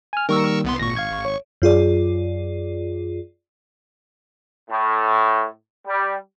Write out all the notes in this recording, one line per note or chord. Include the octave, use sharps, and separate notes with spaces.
G#5 F6
D#3 G3 A#3 A#4 C#6 E6
C2 B3 C6
G#1 A#2 C#6 A#6
F5 G#6
C#5
F#2 F4 G#4 D5
A2
G3